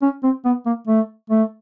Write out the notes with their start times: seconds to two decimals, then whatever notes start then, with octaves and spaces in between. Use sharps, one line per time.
0.02 C#4
0.23 C4
0.45 B3
0.66 A#3
0.87 A3
1.30 A3